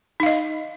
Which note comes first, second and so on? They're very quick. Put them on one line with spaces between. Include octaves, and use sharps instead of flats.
D#4 F5 D#5